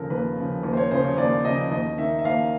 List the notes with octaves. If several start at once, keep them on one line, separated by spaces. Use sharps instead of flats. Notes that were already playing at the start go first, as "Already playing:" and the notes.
Already playing: D#2 C#3 F3 A4 A#4
D#2 B4
C#3 F3
D#2
C5
C#5
C#3 F3 C5
C#5
D#2 D5
C#3 F3 D#5
D#2 D#5
D#3 E5
E5
D#2 F5